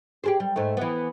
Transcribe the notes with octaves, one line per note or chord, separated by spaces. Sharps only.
G4 G#4 C5
G3
G#2 A3
E3 B3